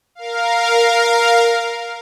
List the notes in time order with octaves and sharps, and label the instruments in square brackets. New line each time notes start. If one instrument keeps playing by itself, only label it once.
[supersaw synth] A#4 F5